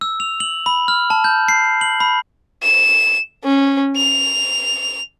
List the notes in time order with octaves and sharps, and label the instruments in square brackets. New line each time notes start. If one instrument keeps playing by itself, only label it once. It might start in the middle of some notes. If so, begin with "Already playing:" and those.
[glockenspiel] E6
F7
F#7
B5
F6
A5
G6
C7
F#7
B5
[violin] E7
C#4
F7